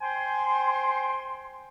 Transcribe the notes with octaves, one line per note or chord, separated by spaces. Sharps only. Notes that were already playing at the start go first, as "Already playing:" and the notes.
C5 G5 G#5 C6